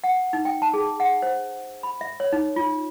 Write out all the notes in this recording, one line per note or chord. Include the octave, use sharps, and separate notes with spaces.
F#5
D#4
G5
A5
G#4
F#5
C5
B5
E5
C#5
D#4
F4